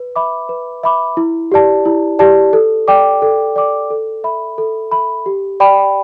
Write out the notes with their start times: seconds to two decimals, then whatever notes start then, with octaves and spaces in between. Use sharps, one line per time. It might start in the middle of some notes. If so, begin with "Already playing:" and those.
Already playing: B4
0.16 E5 B5 D6
0.49 B4
0.84 E5 B5 D6
1.17 E4
1.52 G4 D5 A5
1.85 E4
2.19 G4 D5 A5
2.53 A4
2.88 D5 G5 D6
3.22 A4
3.56 D5 G5 D6
3.90 A4
4.24 E5 B5
4.58 A4
4.92 E5 B5
5.26 G4
5.60 D5 G5 B5